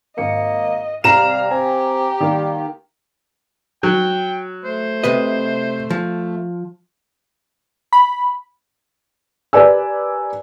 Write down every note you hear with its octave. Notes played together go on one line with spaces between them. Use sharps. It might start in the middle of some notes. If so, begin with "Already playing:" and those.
G#1 A#3 D#5 C#7
C3 G3 F5 A#5 E7
C4 G4 G#5
D#3 G3 A#3
F#3 G5
A3 C5
C3 B4 D#5
F3
B5
G4 A#4 B4 D5 G#5 E6